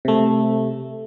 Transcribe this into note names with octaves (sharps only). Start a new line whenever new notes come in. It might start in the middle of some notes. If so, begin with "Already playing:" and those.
C3 A3